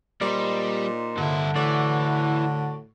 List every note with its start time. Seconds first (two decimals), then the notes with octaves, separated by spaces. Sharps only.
0.21 A#2 G3 D#4 C5 D5
1.17 G2 D3 E4
1.56 A2 E3 F#4 D5